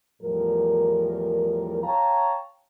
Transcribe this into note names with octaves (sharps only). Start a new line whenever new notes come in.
E2 A2 F3 G3 A#4
C#5 F5 G5 A5 A#5